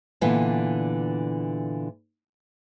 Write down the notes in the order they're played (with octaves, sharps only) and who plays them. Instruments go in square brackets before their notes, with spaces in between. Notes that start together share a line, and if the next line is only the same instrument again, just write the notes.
[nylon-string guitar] A#2 D3 E3 B3